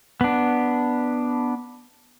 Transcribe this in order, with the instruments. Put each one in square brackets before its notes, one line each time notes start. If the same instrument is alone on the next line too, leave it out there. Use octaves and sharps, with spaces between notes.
[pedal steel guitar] B3 D4